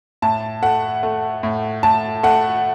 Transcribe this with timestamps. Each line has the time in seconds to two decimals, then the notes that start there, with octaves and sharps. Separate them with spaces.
0.22 A2 A5
0.62 A3 F#5
1.03 A3
1.43 A2
1.83 A2 A5
2.23 A3 F#5